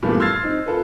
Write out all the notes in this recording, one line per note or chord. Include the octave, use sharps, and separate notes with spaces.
G2 A#2 E3 G3 A3 B3
C6 E6 F6 G#6 A6 C7
C4 D#4
F4 A4 B4